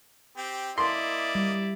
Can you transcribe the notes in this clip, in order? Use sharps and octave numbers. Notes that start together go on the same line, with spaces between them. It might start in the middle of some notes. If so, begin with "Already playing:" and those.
C4 G4
A#3 E4 D5 D#5 C6
G3